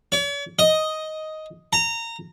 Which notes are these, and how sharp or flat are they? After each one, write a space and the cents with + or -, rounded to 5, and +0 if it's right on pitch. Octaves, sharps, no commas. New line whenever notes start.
C#5 +45
D#5 +5
A#5 -20